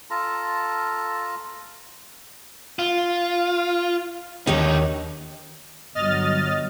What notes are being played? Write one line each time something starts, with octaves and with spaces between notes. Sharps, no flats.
F4 A4 A5 A#5
F4
D#2 D3 D#3 D#4 C#5
G1 G2 F#3 D#5 F6 A6